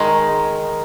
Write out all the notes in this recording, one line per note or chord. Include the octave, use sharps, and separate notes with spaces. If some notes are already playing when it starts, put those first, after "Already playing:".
Already playing: D#3 G#3